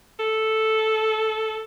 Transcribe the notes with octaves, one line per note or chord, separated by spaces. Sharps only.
A4